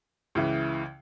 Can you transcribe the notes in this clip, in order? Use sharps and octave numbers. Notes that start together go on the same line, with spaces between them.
C#2 C#3 E3